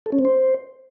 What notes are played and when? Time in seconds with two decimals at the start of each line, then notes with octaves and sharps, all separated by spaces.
0.06 A4
0.12 C#4
0.19 C4
0.25 C5